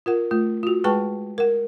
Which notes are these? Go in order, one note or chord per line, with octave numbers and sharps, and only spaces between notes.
F4 A#4 F#5
A3 F4
F4 F#4
G#3 G#4 B4 G5 A5 C#6
A#4 F#5